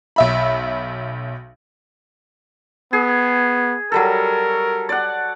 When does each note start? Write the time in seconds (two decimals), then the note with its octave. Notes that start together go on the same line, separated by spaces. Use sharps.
0.16 B1 E5 B5
2.93 B3 G#4
3.92 F#3 G3 A4 A#4
4.89 D5 F#5